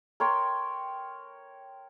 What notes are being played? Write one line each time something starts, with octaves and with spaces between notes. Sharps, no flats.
A#4 C#5 G5 C6